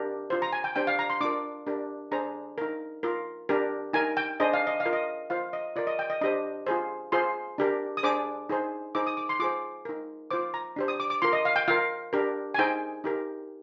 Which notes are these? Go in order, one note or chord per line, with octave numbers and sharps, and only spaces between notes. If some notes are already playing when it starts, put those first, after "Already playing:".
Already playing: D4 G4 A#4
F4 C5
A#5
G#5
G5
D4 G4 C5 G5
F5
A#5
C6
D4 F4 A#4 D6
D4 G4 A#4
D4 G#4 C5 A#5
D#4 A#4
F4 A#4
D4 G4 A#4
D#4 A#4 G#5
G5
D4 G#4 C5 D#5
F5
D#5
F5
F4 A#4
D#5
F4 C5 F5
D#5
F4 A#4 D5
D#5
G5
D#5
D4 G4 C5 D#5
F4 G#4 C5
F4 G#4 C5 C6
D4 G4 A#4
D#6
D4 G#4 C5 D6
D#4 G#4 C5
D#4 G#4 C5 D6
D#6
D6
C6
F4 G#4 C5 D6
D#4 A#4
F4 C5 D6
A#5
D4 G4 C5
D#6
D6
D6
F4 A#4 C6
D#5
F5
G5
F4 A#4 F5
D4 G4 A#4
G#5
D#4 G#4 C5 G5
D#4 G4 A#4